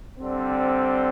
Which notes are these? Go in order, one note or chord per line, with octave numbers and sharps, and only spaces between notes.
D3 G3 C4
C5